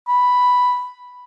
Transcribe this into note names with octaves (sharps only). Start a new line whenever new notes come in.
B5